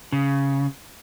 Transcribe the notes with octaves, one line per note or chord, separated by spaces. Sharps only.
C#3